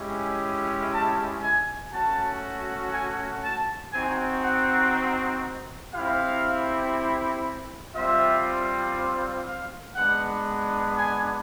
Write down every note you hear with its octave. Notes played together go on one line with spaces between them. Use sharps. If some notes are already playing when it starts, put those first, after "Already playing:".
Already playing: G#3 C#4 E4 G4
A5
G#5
A3 C#4 F#4 A5
G#5
A5
C4 D#4 F#4 G#5
F#5
C4 E4 G4 F5
G3 C4 F4 E5
F5
G#3 B3 D4 F#5
G#5